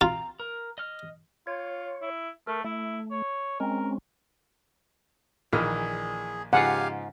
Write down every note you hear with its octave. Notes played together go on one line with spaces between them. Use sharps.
C4 F4 A#5
A#4
D#5 F6
F4 C#5
E4
A3 A#4
A3 E4
C#5
G#3 C4 C#4 A#4
A#1 D#3 E3 G#4 F6
G#2 C#3 F3 F4 G4 F5 F#5 G#5